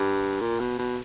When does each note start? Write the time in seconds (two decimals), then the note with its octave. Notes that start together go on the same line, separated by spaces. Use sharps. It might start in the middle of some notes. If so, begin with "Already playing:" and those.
Already playing: G2
0.41 A#2
0.60 B2
0.78 B2